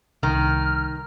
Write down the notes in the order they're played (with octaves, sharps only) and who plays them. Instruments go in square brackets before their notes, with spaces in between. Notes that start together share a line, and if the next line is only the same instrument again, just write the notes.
[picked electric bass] C2 [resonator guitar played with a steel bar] D#3 [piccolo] F6